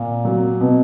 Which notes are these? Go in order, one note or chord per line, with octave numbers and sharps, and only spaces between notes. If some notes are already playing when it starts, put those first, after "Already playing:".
Already playing: A#2
F#3
B2